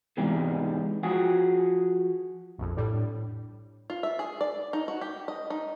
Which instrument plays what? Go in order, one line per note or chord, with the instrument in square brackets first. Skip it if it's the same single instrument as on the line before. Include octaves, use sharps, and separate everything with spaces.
[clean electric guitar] E2 G#2 C3 E3 G3 G#3
F3 F#4 G#4
[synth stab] A#1 F2
[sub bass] A2 [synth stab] D3 G3
[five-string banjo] F4
E5
G#4
D5
D#4
F#4
G4
D#5
D#4